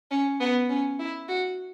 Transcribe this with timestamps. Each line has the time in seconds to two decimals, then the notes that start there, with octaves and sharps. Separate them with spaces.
0.11 C#4
0.40 B3
0.69 C#4
0.99 E4
1.28 F#4